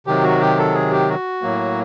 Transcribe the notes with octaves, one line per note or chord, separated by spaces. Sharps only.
C3 D#3 F#3 G4
F#4
G4
A4
G#4
G4
F#4
A2 F#3 A#3